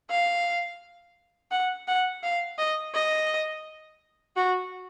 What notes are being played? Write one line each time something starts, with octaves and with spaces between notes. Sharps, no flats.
F5
F#5
F#5
F5
D#5
D#5
F#4